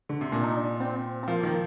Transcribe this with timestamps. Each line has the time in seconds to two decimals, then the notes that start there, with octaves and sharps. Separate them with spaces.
0.09 D3
0.21 C3
0.32 A#2 D4
0.44 D#4
0.57 D4
0.80 C4
1.23 C4
1.28 F3 A#3
1.43 D#3